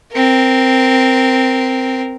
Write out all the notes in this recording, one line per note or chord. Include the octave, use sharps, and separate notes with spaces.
C4 A#4